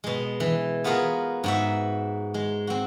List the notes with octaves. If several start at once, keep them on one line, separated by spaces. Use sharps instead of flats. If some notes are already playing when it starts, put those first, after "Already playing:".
B2 G#3
E3
B3 F4 F#4 G#4 A#4
G#2 F#4 E5
G#3
C4 F#4